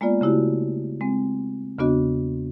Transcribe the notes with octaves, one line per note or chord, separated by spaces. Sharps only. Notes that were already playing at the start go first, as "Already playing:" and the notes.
G#3 A#3 B3 F4 D5
C#3 A3 E4 F#4 G4
G#3 C4
E2 C#3 B3 D4 F#4 D#5